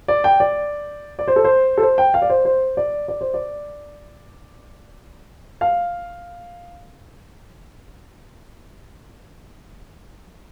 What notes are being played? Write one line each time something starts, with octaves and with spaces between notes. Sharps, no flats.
D5
G5
D5
D5
C5
A4
C5
A4
C5
G5
F5
D5
C5
C5
D5
D5
C5
D5
F5